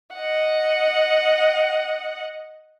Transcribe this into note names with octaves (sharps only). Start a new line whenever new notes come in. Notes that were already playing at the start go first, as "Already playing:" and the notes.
D#5 F#5